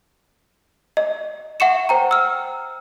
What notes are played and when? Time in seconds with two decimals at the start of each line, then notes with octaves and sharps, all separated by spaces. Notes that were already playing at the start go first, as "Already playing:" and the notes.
0.97 D#5
1.60 E5 F#5 C#6 C#7 E7
1.89 C5 G5 A#5
2.11 E6 F6